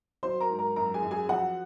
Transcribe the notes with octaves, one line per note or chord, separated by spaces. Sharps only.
F#3 C5 C6
A#4 A#5
G#2
A#4 A#5
F#2 A#4 A#5
G#4 G#5
F#2
G#4 G#5
F3 F#4 F#5